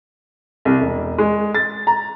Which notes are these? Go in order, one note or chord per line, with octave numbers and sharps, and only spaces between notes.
C2
E1
G#3
A6
A#5